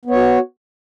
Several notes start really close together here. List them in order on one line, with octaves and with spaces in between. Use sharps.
B3 C#5 F#4